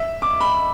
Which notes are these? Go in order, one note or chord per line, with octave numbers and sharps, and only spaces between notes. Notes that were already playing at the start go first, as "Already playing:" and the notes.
Already playing: E5
D6
B5